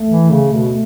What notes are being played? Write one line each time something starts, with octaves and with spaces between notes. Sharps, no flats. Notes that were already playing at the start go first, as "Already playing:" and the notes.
Already playing: A3
E3
C#3
B2